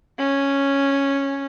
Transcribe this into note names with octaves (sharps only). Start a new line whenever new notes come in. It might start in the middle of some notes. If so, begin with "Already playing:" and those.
C#4